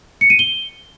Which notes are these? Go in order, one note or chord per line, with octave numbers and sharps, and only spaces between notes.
C#7
D#7
G7